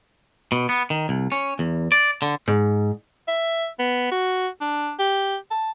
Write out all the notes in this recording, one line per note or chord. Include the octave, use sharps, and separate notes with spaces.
B2
B3
D#3
C2
C#4
E2
D5
D3
G#2
E5
B3
F#4
D4
G4
A5